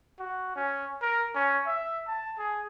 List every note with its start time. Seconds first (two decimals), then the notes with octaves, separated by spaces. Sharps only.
0.20 F#4
0.56 C#4
1.02 A#4
1.35 C#4
1.67 E5
2.08 A5
2.38 G#4